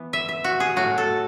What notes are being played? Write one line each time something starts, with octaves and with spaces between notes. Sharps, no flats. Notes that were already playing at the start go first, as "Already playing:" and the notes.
Already playing: E3 B3
E5
E5
F#4
G#4
A2 F#3 A3 D#4 F#4
A4